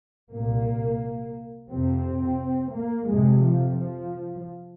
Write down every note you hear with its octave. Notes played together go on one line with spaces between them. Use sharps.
C2 A#2 A#3
F2 C3 C4
A#3
F2 C3 G#3
F3
F3